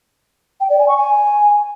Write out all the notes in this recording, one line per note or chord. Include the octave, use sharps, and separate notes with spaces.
G5
D5
G#5
C#6
G#5